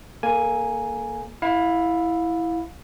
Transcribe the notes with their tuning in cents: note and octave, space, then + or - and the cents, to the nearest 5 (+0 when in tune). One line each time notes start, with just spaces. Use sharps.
A#3 +0 A4 -30 G#5 +0
E4 +0 F5 +30